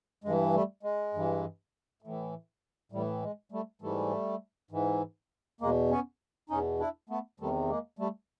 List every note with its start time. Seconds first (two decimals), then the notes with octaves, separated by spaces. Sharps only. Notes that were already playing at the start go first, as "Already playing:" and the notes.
0.24 G2 E3 G#3
0.53 G3 A3
0.83 G#3
1.14 G2 E3
2.02 A2 E3
2.92 A2 E3 G3
3.23 G#3
3.52 G3 A3
3.82 G#2 E3 G3 A3
4.71 G#2 E3
5.61 E2 B2 G#3 A#3
5.90 B3 C#4
6.50 E2 B2 C#4 D#4
6.79 D4 E4
7.09 A3 B3
7.40 E2 C3 D#3 G3 A3
7.69 G#3 A#3
7.99 G3 A3